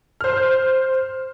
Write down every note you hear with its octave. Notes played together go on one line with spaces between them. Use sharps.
C5 F6